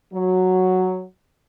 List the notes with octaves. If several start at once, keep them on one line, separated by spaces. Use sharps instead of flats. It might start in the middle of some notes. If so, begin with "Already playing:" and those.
F#3